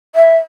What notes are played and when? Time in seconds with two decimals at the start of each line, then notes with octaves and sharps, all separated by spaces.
0.15 E5